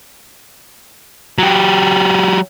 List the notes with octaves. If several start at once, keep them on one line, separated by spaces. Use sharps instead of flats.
F#3 G4